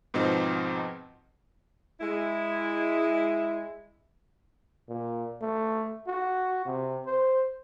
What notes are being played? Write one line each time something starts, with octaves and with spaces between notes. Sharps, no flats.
G#2 B2 F3 C4 D#4
G#3 E4
A#2
A3
F#4
C3
C5